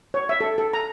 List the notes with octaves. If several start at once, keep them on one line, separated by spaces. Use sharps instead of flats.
C#5
E5
A4
A4
A#5